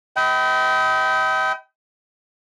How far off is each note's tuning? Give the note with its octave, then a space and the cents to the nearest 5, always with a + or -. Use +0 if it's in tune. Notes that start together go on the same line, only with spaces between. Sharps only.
D#5 +35 G5 -25 B5 +15